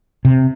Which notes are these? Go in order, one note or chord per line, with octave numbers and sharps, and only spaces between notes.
C3